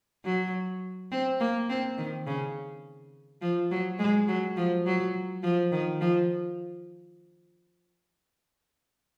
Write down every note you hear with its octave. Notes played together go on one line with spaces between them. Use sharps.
F#3
C4
A#3
C4
D#3
C#3
F3
F#3
G#3
F#3
F3
F#3
F3
D#3
F3